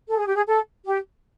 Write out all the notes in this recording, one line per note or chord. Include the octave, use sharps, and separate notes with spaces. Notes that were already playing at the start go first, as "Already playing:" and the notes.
A4
G#4
G4
G#4
A4
G4